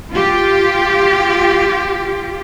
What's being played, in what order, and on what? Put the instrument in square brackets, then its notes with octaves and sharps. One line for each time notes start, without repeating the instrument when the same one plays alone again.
[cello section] F4 G4